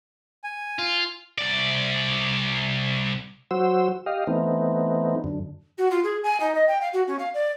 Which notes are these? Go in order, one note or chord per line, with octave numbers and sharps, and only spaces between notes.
G#5
F4
C2 D5
F#3 F#4 C5 E6
G4 D#5 F5
E3 A3 B3 C4 D#4
F#2 D3
F#4
F4
G#4
G#5
D#4
D#5
G5
F5
F#4
C#4
F5
D5